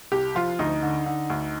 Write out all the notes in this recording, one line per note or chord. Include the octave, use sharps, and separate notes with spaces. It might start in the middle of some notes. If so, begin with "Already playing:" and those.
C2 G4
F3 F4
D2 D#4
D3
D3
D2